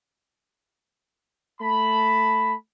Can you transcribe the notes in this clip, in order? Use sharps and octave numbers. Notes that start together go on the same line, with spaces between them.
A3 A5 B5